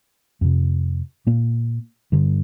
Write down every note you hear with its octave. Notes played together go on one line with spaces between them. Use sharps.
F2 C3
A#2 A#3
G2 D3